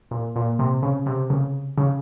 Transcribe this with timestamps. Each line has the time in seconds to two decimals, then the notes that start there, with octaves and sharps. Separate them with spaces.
0.11 A#2
0.36 A#2
0.59 C3
0.83 C#3
1.06 C3
1.30 C#3
1.78 C#3